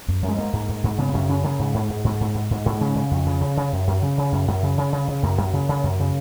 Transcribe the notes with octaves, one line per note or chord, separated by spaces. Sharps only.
F#2
F#2
G#3
G#2 A#3
G#2
G#2
G#2
C#3 B3
B3
F#2 C#4
C#3 C#4
C#3 A#3
G#2
G#2
G#2
G#2
G#2
G#2
G#2
G#2
C#3 C#4
C#3
F2
C#3
C#3
C#3
F#2
F#2
C#3
C#3
F#2
F#2
C#3
C#3
C#3
C#3
F#2 A#3
F#2
C#3
C#3
F#2
C#3